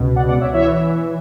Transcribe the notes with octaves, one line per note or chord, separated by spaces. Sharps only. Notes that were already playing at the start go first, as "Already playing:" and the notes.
Already playing: C#2 B2
D5 F#5
D5 F#5
C#5 E5
E3 C#5 E5